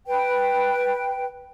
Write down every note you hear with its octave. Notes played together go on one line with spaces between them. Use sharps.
B4 G5